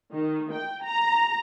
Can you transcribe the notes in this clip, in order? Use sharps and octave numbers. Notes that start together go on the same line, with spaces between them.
D#3
G5
A#5